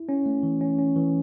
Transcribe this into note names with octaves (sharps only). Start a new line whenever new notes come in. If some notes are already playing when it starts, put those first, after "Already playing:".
Already playing: E4
C#4
A3
E3
C#4
C#4
E3